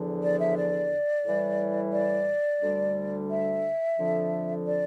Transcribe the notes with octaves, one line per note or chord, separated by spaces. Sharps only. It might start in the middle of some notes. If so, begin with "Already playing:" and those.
Already playing: E2 D3 F3
D5
E5
D5
A2 E3 G3
D5
D2 D3 G3
E5
F2 D3 F3
D5